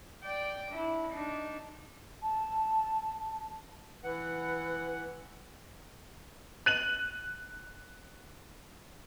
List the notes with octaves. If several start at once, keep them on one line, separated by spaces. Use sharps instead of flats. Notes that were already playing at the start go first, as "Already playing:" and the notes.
D5 G5
D4 E4
D4 D#4
A5
E3 B4 F#5
F#6 D#7 F#7